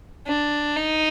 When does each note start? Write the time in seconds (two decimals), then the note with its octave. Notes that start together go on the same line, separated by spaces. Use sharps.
0.27 D4
0.76 D#4